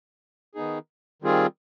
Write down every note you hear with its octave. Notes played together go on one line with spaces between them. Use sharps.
D#3 B3 D#4 G#4
D#3 G3 C4 F4 G#4